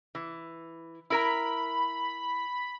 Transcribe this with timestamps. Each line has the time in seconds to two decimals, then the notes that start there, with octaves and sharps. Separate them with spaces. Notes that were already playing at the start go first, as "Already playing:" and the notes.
0.15 E3
1.10 E4 A#4 A#5 B5